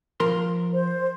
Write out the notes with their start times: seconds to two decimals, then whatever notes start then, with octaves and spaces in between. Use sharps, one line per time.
0.20 F3 A#4 C6
0.73 C5